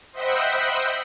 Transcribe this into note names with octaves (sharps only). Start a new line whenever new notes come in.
C5 D#5 E5 F#5 G5 B5